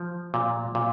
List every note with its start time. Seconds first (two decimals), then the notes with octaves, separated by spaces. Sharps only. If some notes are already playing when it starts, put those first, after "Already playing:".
Already playing: F3
0.34 A#2
0.75 A#2